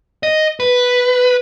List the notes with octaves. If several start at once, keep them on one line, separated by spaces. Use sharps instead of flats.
D#5
B4